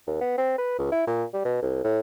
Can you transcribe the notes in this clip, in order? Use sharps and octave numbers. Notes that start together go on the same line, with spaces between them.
D#2
B3
C4
B4
C#2
E4
A#2
G3
B2
C2
A2